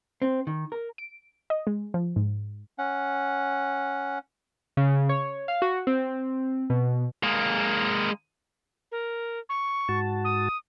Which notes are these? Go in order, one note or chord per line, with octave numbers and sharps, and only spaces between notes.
C4
D#3
A#4
D7
D#5
G#3
F3
G#2
C#4 F#5
C#3
C#5
F5
F#4
C4
B2
G#3 A#3
A#4
C#6
G#2 F#4 A5
D#6